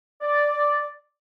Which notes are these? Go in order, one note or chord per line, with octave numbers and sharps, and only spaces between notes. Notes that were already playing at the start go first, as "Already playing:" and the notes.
D5